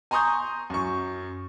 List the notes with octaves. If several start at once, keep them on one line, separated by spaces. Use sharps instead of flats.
G#5 A#5 C6 C#6 D#6 G6
F#2 C#6